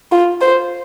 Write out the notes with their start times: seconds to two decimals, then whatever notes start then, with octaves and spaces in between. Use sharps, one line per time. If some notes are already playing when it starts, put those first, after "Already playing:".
0.12 F4
0.41 C5